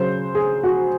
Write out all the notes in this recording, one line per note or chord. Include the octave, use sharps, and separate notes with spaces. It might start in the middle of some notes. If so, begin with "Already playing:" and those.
Already playing: C#3 F#3 C5
G#4
F#4